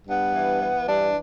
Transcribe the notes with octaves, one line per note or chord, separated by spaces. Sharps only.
G2 B3
E3
E3
G2 D4